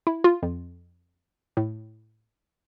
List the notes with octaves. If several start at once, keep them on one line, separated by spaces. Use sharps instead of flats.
E4
F4
F2
A2